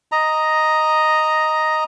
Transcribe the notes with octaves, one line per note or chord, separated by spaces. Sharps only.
D#5 A#5